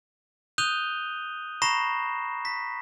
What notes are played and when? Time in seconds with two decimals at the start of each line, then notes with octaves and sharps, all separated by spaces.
0.58 D#6 F#6 G6 D#7 F7 G7
1.62 A#5 B5 C#6 A#6 C7 E7
2.45 B6